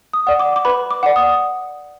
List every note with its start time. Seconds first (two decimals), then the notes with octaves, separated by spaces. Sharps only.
0.13 D#6
0.27 D5 F#5
0.40 D6
0.56 D6
0.65 B4 B5
0.91 D6
1.03 D5 F#5
1.16 D#6